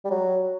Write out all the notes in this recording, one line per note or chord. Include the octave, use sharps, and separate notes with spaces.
G3
F#3